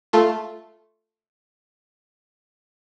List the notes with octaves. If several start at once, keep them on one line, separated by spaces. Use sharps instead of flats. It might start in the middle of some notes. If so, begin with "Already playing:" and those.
A3 F4 A4